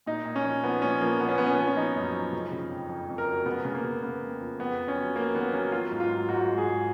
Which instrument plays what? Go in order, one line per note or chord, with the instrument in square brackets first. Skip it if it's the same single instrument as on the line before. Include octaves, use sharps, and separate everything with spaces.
[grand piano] A#2 D#4
A#2
C#4
F3
F3 B3
A#2 C#4
F3 A#3
F3 B3
C#4
F3 B3
C#4
F3 B3
C#4
F3 D#4
F#2
F3
C#3
C#3
F2
F2
F2
A#4
F#3
C#3 B3
C#3
A#3
C#3
C#3 B3
F2
F3
F2 B3
F2
C#4
F#3
F#3 A#3
D#3 B3
F#3 C#4
F#3 F4
G#2
F4
F#3
G#2 F#4
G#2
G#4
G#2